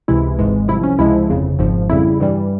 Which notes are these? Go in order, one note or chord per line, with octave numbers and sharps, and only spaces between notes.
C#2 C3 E3 G#3 E4
G#1 G#2 E3 G#3
C2 C3 F3 E4
C#4
C#2 C3 F3 G#3 E4
G1 F2 C#3
G#1 G#2 F3
F2 C#3 G3 E4
G2 E3 G3